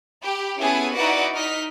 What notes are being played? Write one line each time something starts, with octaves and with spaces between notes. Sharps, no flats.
G4 B5
B3 C#4 E4 G#4 A4 B4
D#4 E4 F#4 B4 D5 F#5
D#4 D#5 F6 B6